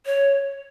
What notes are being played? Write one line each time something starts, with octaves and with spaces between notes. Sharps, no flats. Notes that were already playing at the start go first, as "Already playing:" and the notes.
C#5